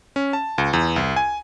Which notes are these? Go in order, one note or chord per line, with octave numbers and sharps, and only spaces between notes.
C#4
A5
C#2
E2
C2
G#5